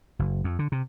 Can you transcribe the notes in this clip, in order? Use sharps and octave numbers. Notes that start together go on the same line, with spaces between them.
F#1
F2
D3
C3